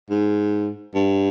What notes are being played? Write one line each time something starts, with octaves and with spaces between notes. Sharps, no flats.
G#2
G2